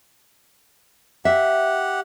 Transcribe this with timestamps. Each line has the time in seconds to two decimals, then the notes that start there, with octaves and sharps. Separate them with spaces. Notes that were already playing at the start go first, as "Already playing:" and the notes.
1.25 G4 E5 F#5